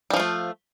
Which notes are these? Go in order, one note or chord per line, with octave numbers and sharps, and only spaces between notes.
F3 G3 A3 F4